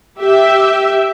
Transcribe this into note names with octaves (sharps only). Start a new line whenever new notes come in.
G4 E5